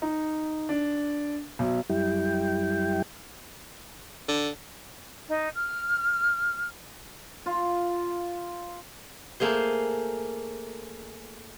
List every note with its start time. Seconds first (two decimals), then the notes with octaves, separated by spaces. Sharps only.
0.02 D#4
0.69 D4
1.59 B1
1.89 F#2 G3 E4 G5
4.28 D3
5.29 D#4
5.54 F6
7.46 F4
9.40 A3 A#3 G#4 C5